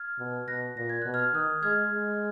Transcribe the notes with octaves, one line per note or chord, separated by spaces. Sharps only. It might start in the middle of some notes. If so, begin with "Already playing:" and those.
Already playing: F6 G#6
B2
B2 F#6 A#6
A#2 A#6
G#6
B2 F#6
F6 G#6
D#3 D#6 F#6
G#3 F6 G#6
G#3